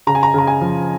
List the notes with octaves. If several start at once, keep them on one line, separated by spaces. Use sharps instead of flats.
C#3 A#5
G#5
A#5
C#3 A#5
G#5
F3